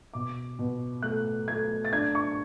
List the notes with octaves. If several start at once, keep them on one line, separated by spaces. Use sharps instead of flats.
B2 D6
B2
A3 F#6
A3 G#6
A6
D4 G#6
C#6